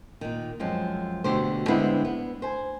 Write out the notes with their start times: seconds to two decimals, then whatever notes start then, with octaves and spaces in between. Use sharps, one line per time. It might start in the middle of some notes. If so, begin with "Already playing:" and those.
0.21 A#2 D#3
0.60 F#2 F3 G#3 C4
1.24 D2 B2 D3 G4 C5
1.68 D3 G#3 B3 C4 D4 E4
2.05 B3
2.42 C5 G#5